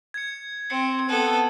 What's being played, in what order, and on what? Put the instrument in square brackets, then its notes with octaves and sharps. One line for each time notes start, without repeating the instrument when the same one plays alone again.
[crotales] G#6 C#7
[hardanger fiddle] C4 [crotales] C#7
[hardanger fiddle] B3 A4